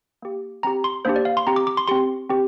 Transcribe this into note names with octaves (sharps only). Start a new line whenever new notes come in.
A#3 G4
C4 G4 A#5
C6
A#3 D4 G4 C5
D5
F5
C6
C4 G4 A#5
D6
D6
C6
C4 G4 C6
C4 G4